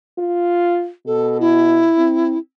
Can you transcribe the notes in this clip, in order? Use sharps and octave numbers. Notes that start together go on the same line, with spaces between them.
F4
B2 A4
E4
C4